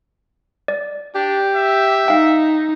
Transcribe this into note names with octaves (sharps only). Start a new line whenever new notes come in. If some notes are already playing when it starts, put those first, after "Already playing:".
D5
D4 G4
E5
D#4 F5 G5